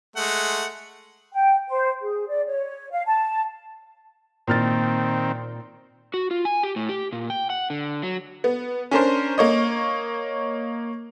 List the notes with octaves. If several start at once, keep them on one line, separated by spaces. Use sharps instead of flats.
G#3 A3 F#5
G5
C5
G#4
D5
C#5
F5
A5
A#2 D#3 C4 F6 A6
F#4
F4
G#5
G4
A2
G4
A#2
G5
F#5
D3
F#3
B3
C#4 D4 A#4 C5
A#3 C#5 D#5